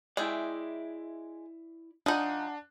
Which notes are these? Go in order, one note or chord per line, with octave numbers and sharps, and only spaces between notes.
G#3 E4 G#4 D5 E5 G5
F3 D4 D#4 F#5 G#5 D#6